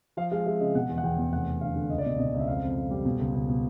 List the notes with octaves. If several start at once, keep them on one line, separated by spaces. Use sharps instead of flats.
F3 F5
G#3 F5
G#3 E5
C#3 D#5
B2 F#5
E2
F#5
E2 G5
E2
F1 F#5
F1
D3 F5
D3
C#2 D#5
D5
B2 D#5
B2 D#5
C#2
E5
F2 F5
F2
F2
G3
B2
C#2
C#2
B2